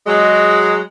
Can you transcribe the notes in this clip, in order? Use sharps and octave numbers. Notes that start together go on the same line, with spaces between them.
F#3 G#3